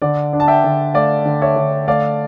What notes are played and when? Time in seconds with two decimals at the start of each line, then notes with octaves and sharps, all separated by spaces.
0.02 D3 D5
0.33 D4
0.40 A5
0.48 E5 G5
0.64 D3
0.94 A3 D5 F5
1.25 D3
1.42 C#5 E5
1.56 D3
1.88 A3 D5 F5